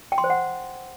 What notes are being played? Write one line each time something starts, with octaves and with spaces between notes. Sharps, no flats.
G5
C6
C5
F#5